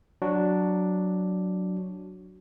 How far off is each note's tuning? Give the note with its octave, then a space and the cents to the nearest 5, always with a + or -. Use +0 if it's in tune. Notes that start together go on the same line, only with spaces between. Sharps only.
F#3 +0 D4 +0 F#4 +0